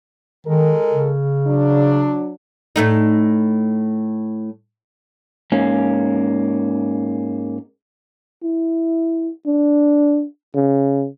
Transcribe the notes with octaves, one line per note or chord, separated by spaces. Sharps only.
D#3 G#3 A4 A#4
C#3
F#3 D4
A2 A3 D#4
G#2 A#3 C#4
E4
D4
C#3